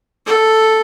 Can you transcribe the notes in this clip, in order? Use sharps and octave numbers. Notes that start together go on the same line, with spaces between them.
A4